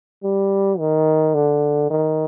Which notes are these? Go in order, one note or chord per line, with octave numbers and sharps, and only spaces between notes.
G3
D#3
D3
D#3